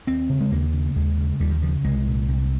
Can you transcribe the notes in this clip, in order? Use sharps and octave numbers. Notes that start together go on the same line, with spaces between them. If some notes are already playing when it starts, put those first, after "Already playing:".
D#2 C4
C#3
G#3
D#2 A#3
C#3
D#2 G#3
C#3
D#2 G3
D#3
C#3 F3
C2 G#3
A#2
C2